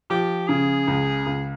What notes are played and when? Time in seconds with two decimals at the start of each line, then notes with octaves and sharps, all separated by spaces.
0.10 F3 G4
0.49 C#3 G#4
0.87 C#2
1.26 C#2